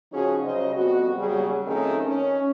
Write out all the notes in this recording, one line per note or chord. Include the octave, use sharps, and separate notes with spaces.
C#3 F3 C#4 D#4 F#4 G#4
C#3 F#3 G3 C5 D#5
F2 B2 G3 B3 F#4
D#2 C#3 F#3 G3 G#4
F2 D#3 A3 C#4 D#4 G#4
C#4